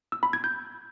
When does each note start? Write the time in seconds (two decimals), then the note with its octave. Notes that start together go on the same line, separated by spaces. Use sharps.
0.12 E6
0.23 B5
0.33 G#6
0.44 G6